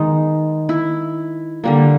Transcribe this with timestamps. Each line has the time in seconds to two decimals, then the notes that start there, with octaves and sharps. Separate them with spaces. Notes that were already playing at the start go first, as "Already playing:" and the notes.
Already playing: D#3 G#3 B3 D#4
0.69 E4
1.64 D3 G3 A#3